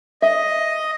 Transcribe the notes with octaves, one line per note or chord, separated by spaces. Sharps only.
D#5 E5